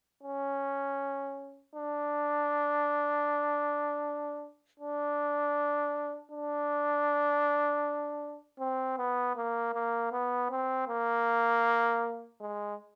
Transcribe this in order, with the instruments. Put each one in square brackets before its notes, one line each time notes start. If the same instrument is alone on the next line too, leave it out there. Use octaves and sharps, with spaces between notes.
[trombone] C#4
D4
D4
D4
C4
B3
A#3
A#3
B3
C4
A#3
G#3